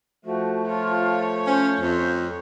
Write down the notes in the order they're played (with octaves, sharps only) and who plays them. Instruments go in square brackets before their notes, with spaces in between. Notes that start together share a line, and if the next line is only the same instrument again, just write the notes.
[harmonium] F3 A3 [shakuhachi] F#4
[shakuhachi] F4 [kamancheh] C#5
[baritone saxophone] C#4 [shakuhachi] C5
[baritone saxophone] F2